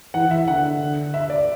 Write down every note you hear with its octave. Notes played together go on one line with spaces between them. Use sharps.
E3 F#5
E5
D3 F#5
E5
D5